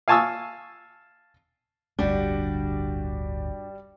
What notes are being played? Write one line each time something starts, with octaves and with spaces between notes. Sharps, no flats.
F5 G#5 A5 C#6 D#6 E6
D1 G1 D3 G3 D4 F#4 G4 D5